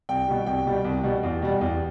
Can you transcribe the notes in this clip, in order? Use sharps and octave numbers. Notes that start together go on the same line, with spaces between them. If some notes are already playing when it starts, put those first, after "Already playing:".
C2 G5
B2 G3
C2 G5
B2 G3
C2
B2 G3
E2
B2 G3
E2